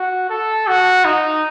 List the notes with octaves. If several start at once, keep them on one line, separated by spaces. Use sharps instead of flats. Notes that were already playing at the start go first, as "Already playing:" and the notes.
Already playing: F#4
A4
F#4
D#4